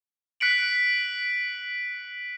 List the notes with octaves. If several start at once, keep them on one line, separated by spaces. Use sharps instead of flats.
F#6 B6 C#7 D7 F#7